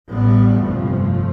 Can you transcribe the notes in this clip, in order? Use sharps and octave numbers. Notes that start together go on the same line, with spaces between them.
A1 A2 G3 B3
G1 F2 C3 F3 A3